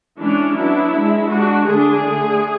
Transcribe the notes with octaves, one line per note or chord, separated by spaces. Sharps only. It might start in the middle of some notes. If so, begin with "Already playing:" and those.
E3 G#3 C#4 D4
F#3 B3 D4 E4
G#3 D4
G#3 D4 F#4
D3 A3 D4 G#4
D3 A3 D4